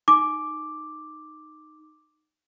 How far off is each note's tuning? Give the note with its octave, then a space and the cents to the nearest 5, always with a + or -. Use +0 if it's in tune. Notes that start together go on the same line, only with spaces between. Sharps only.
D#4 -10 D6 +0